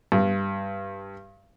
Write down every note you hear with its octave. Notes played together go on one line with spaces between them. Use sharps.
G2